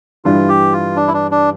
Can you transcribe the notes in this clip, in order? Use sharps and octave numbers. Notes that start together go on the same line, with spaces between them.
G2 E3 G3 D4 F4
G4
F4
D4
E4
D4
D4